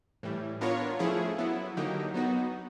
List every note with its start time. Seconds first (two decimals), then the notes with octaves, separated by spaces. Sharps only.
0.23 A2 E3 G3
0.61 B3 D4 F4 A#4 C#5
0.99 F3 A3 C#4 E4 G#4
1.38 F#3 B3 E4
1.77 D3 F#3 A#3 D#4 G4
2.14 F#3 B3 D#4 F#4